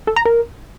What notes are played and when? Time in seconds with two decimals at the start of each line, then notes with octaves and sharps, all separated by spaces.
0.07 A4
0.16 A#5
0.25 A#4